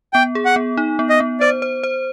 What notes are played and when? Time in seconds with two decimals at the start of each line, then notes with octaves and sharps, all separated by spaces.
0.14 B3 G5
0.35 G#4
0.46 F#5
0.56 B3
0.77 D#4
0.99 B3
1.10 D#5
1.20 B3
1.40 C5 D5
1.62 C5
1.83 C5